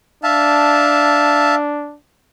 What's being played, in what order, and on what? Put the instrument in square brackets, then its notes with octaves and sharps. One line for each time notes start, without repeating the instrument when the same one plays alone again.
[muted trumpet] D4 [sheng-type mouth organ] E5 F5 A5